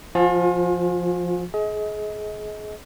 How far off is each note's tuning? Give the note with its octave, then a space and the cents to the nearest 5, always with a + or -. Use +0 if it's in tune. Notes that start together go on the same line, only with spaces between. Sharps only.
F3 +0 F4 +40 G#5 +0
G#4 +30 D#5 +30